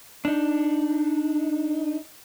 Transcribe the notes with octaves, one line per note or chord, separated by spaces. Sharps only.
D4 D#4